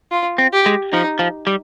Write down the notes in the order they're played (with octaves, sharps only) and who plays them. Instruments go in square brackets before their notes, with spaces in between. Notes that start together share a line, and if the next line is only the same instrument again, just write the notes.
[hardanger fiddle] F4
[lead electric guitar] C4
[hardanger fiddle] G4
[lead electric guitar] G#3
[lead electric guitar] F3 [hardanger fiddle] D#4
[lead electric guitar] F3
G3